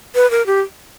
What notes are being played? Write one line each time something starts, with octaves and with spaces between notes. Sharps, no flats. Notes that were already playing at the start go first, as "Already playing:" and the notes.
B4
A#4
G4